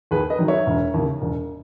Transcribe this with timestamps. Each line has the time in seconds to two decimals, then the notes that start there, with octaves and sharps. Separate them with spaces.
0.11 D#2 G#4 B4
0.30 B4 D#5
0.38 D#3 F#3
0.48 C#5 E5
0.66 E1
0.94 D#2 C#3
1.21 E1